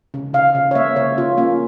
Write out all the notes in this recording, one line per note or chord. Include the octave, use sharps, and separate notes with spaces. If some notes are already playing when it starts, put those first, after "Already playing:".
C#3
C#3 F5
C#3
C#5
A#3 E5
C#3 C#5
C#3 F4
A#3 C#4